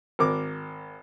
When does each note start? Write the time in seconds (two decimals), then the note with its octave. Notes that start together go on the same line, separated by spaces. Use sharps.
0.19 G#1 A#4 D6